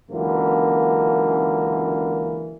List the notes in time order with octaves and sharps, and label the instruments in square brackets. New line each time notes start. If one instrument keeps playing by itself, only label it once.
[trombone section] C#2 F#2 D3 E3 A#3